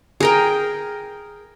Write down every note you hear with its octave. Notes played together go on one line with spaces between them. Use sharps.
G#4 A#4 G5